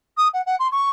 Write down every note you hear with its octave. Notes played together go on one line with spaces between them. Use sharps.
D#6
F#5
F#5
C6
C#6